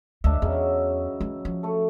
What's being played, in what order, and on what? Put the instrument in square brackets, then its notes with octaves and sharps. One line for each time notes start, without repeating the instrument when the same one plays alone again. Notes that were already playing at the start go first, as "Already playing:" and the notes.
[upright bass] D2 [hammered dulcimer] D4 D#5 E5
[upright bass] E2 [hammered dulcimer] C#3 F#3
[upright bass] E3
F3
[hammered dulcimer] A3 A4